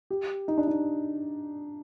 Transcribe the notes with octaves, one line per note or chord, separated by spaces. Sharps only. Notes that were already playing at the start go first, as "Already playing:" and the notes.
G4
D#4
D4
D#4